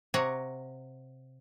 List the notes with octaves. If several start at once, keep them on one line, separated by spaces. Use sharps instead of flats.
C3 C#5 F#5 A#5